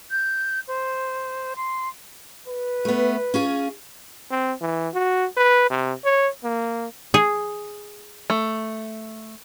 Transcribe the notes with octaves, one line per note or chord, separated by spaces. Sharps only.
G6
C5
C6
B4
A3 B3
C#4 F4 G#4
C4
E3
F#4
B4
C3
C#5
A#3
G#4
A3